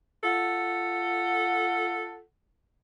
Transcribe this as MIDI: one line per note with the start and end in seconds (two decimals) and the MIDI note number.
0.23 2.20 65
0.23 2.20 69
0.23 2.20 78